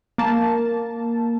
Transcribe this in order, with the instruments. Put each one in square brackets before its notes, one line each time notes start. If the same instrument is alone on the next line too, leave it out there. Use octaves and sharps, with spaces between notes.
[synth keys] A#3 A5